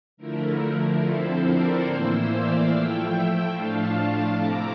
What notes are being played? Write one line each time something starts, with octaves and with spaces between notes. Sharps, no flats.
D3 F3 A3 E4 A#4
D3 F3 C4 E4 A4 C5
A#4 D5
A2 E3 A#3 E4 C5 E5
D5 F5
F3 A3 E4 E5 G5
A2 F3 A3 D4 F4 F5 A5
C3 F3 A3 C4 E4 A#5 D6